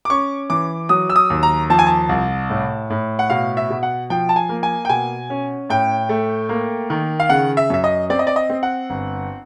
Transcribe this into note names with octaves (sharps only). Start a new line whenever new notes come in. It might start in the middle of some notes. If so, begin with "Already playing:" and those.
D6
C#4 C#6
E3 D6
F#3 D#6
E6
D#6
D#2
A#5
F3 A5
G#5
A5
C2
A2
A2
F#5
B2 F5
E5
B2
F#5
F3 G5
A5
G#5
A#3
G#5
G5
B2 G#5
C#4
A2 G5
A3
A#3
D#3
F5
C#3 F#5
E5
F#2 E5
D#5
C4 D5
D#5
D5
D#5
C4
F#5
G1